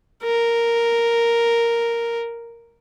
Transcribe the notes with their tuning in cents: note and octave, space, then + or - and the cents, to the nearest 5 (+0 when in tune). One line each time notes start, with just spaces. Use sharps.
A#4 +0